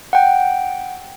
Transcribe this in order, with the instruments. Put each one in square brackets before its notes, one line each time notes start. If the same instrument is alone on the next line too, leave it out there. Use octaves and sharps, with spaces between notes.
[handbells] F#5 G5